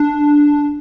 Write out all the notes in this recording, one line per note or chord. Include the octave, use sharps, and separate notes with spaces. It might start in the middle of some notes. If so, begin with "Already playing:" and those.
Already playing: D4